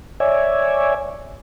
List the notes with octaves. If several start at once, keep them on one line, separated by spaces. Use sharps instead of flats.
C#5 D5 E5 G#5